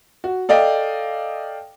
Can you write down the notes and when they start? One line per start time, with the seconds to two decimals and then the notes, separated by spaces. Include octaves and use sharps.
0.24 F#4
0.49 A4 D5 D#5 F5 G5